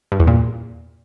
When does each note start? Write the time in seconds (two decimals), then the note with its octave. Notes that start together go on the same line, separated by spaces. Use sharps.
0.12 G2
0.20 E2
0.27 A#2